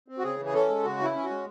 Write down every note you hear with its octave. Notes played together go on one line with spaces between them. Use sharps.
C4
F#4
C#3 G#4
E3
G#4
C#4 A4
G#3
C#3 F#4
E3 E4
C#4
F#4
G#3